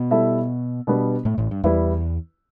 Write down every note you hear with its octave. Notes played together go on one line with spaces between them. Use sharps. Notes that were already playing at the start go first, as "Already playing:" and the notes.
Already playing: B2 B3
G3 E4 A4 E5
B2 G3 B3 D4
A2 A3
A1 A2
G2
E2 G3 E4 B4